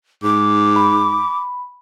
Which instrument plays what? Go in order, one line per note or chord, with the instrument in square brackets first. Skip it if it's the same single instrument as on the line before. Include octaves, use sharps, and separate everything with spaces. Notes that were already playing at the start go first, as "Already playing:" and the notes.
[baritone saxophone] G#2 [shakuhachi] D6
[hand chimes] B5